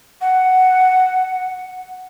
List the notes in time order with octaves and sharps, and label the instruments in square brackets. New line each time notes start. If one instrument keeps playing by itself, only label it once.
[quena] F#5